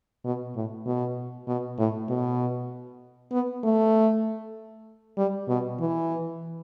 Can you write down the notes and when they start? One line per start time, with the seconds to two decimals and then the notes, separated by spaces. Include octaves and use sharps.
0.25 B2
0.55 A2
0.86 B2
1.48 B2
1.78 A2
2.09 B2
3.32 B3
3.64 A3
5.17 G3
5.48 B2
5.80 E3